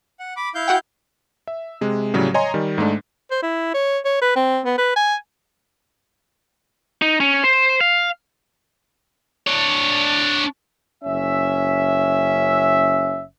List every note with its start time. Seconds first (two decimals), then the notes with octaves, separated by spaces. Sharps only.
0.19 F#5
0.37 B5 D6
0.55 E4 F5 G6
0.68 F#4 F#5 G5
1.47 E5
1.81 C3 G#3
2.14 A2 C#3 F#3 G3
2.34 C#5 D#5 G#5 A#5 C6
2.54 D#3 G3
2.78 G#2 G#3 A3 D4
3.31 C5
3.42 E4
3.74 C#5
4.05 C#5
4.22 B4
4.36 C4
4.65 B3
4.78 B4
4.96 G#5
7.02 D#4
7.20 C#4
7.44 C5
7.81 F5
9.47 D4 C#5
11.03 F#1 C#4 E5